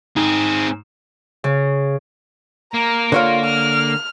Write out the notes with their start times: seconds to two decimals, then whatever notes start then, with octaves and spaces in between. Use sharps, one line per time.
0.16 G#2 C4 G#4
1.44 C#3
2.74 A#3 A#5
3.12 D3 F4 C#5 F5
3.46 F6